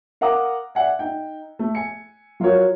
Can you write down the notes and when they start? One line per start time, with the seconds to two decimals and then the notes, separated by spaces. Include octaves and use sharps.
0.21 A#4 F5 F#5 A#5 D6 D#6
0.75 D5 E5 F#5 G#5
0.99 D#4 G5
1.59 A3
1.75 G#5 C#7
2.40 F#3 F4 F#4 A#4 C#5